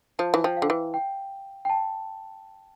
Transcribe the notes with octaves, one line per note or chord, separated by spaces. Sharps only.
F3 A5
E3
F3 G5
F5
D3
E3
G5
G5
A5